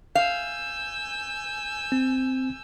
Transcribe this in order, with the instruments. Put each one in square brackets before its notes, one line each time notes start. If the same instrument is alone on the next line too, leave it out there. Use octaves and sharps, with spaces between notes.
[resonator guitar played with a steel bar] F5 [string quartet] G#5 E6 G6
[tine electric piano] C4